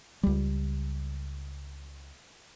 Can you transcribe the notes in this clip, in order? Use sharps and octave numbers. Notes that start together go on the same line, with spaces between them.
C#2 G3